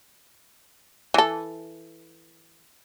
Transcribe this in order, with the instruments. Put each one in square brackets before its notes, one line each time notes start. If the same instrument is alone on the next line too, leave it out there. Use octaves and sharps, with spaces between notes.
[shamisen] E3 A4